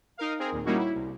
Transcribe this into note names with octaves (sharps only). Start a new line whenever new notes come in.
D#4 A#4 F5
C4 G#4 A#4
D#2 A#2
G3 A#3 C#4 D#4 E4 F#4
E4
C2